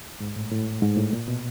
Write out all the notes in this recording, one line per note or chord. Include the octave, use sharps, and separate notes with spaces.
G#2
A2
A2
G#2
A2
A#2
B2